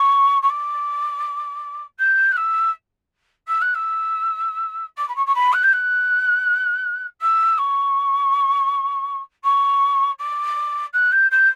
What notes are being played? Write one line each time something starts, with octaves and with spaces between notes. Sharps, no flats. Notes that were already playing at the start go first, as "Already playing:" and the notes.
Already playing: C#6
C#6
D6
G6
F#6
E6
E6
F#6
E6
D6
B5
C#6
C#6
B5
F#6
G6
F#6
E6
C#6
C#6
D6
F#6
G6
G6